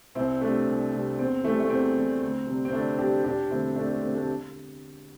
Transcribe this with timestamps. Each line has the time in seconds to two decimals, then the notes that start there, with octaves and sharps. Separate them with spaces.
0.15 C2 C4 E4
0.41 C3 G3 A3 D4
0.67 C2
0.93 C3 G3
1.18 E2 C4
1.44 E3 G3 A3
1.60 A3
1.70 E2 C4
1.96 E3 G3
2.22 D2
2.47 C3 G3
2.65 C4
2.73 D2 A3 D4
2.98 C3 G3 D4 G4
3.24 E1 D4 G4
3.50 D2 D3 G3 C4 E4
3.76 E1 A3 D4
3.89 A3
4.02 D2 D3 G3 C4
4.14 A3 D4
4.23 G4